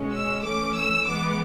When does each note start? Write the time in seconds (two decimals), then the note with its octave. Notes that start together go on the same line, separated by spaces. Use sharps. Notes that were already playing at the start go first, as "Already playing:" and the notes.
Already playing: B2 G#3 C#4
0.13 E6
0.44 E3 A3 C#4 D6
0.75 E6
1.06 E3 G#3 B3 D6